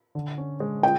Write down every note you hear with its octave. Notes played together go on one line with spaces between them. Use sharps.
D3
C#4
G#3
G5